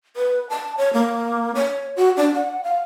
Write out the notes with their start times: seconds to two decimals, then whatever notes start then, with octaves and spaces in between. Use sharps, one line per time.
0.16 B4
0.50 A5
0.78 C#5
0.93 A#3
1.55 C#5
1.97 F#4
2.17 D4
2.35 F#5
2.64 F5